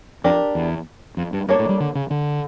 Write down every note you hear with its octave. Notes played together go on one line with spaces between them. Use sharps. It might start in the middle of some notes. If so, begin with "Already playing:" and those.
F2 D4 G4 A#4
E2
F2
G2
G2 A#3 D4 A4 C#5
A2
G3
D3
C#3
D3